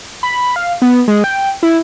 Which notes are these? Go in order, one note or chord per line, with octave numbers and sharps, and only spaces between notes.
B5
F5
B3
G#3
G5
E4